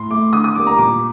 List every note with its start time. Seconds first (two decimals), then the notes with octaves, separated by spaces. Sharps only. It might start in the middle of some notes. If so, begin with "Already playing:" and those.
Already playing: A2 C6
0.11 A3 D6
0.33 D3 D#6
0.44 D#6
0.55 G3 A#3 D6
0.67 A#5
0.78 A#2 D6